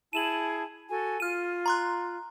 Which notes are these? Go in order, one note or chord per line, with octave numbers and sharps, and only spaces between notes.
E4 G#4 A5 D#7 E7 F#7
F#4 A4 G#5
F4 F6 D#7
A#5 C6 F#6